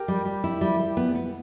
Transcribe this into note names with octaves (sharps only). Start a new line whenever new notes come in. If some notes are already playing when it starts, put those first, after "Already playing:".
Already playing: G4 A#4
G3
G3
E4
G3
G3
B3
B3